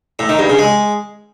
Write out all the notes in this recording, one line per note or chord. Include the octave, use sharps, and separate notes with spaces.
A2
D#3
G2
C#3
G#3